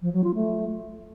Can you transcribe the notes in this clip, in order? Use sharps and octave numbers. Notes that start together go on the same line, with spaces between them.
F3
F#3
F4
A3